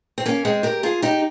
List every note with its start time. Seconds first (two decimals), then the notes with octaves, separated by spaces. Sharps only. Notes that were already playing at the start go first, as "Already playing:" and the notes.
0.18 C4
0.26 A#3 C#4
0.45 G#3 C4
0.63 G4 A#4
0.83 F4 G#4
1.02 D#4 G4